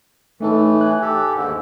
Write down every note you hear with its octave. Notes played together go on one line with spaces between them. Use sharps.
A2 E3 A3 D#4 A4
G#5 F#6
G4 A4
D#2 G#2 D3